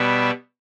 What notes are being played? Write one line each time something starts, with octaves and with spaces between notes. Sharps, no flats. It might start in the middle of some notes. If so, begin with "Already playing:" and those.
Already playing: B2 G3 B3 E5